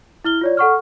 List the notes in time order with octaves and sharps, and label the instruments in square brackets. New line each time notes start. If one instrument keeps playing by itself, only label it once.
[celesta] E4 F6 G7
F4 C#5 D5
A4 F#5 C#6 F6